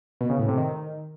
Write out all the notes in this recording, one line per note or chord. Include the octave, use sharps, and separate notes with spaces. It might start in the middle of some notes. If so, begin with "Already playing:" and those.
B2
C#3
A2
C3
D#3